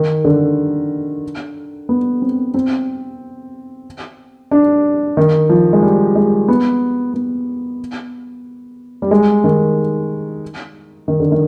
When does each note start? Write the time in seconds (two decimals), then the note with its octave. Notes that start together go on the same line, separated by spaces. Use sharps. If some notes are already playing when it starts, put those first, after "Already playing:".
Already playing: D#3
0.25 D3
1.89 B3
2.22 C4
2.54 C4
4.51 D4
5.17 D#3
5.50 F3
5.73 G#3
5.83 G3
6.15 G#3
6.48 B3
7.14 B3
9.02 G3
9.11 G#3
9.44 D#3
11.08 D#3
11.20 D3
11.32 D#3